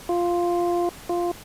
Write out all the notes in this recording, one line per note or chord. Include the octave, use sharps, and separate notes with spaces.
F4
F4